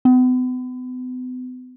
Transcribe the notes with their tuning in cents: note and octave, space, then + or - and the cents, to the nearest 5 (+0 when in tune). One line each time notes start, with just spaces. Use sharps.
B3 +40